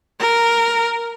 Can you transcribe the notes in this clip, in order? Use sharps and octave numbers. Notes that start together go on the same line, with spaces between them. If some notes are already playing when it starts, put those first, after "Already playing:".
A#4